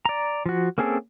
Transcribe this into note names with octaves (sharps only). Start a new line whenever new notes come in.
D5 A#5
F3 F#4
A#3 C4 C#4 G#4 A4